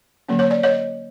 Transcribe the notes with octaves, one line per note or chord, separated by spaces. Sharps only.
D3 F#3 A#3 C#4
C#5
D5
C#5 D#5